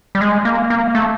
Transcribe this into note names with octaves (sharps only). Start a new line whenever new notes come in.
G3
G#3
A#3
A#3
A3